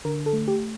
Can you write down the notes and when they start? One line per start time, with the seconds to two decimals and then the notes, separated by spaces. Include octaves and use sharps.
0.05 D3 A#4
0.26 A4
0.33 A3
0.48 G4